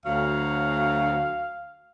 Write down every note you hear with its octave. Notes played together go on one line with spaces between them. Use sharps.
D2 F#3 F5